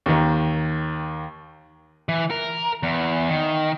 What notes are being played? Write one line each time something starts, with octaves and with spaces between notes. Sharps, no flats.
D#2 D#3
E3
A#4
E2
D#3